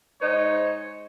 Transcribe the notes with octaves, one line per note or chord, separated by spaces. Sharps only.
G#2 D#4 C5 C#5